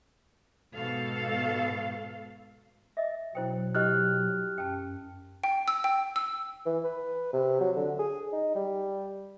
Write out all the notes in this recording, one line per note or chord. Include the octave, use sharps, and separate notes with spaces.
G#2 B2 A4 F5
D#5 E5
B2 F#3 E4 C5 G5
E4 G4 D#5 F6 F#6
F#2 G5 A5
G5
E6
G5
E6
E3
B4
C3
F#3
D3
G#4
D#4
G3